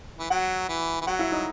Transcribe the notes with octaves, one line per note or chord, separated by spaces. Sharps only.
E3
F#3 F#4 F#5
E3
E3
F#3 F#4 F#5
E4 E5
D#4 D#5